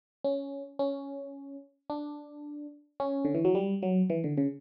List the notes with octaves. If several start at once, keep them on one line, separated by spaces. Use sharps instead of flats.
C#4
C#4
D4
C#4
D3
E3
F#3
G3
F#3
E3
D3
C#3